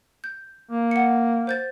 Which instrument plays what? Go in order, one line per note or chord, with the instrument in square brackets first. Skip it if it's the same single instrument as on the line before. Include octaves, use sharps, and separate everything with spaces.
[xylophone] G6
[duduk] A#3
[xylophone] F#5 C#7
C5 G6 A6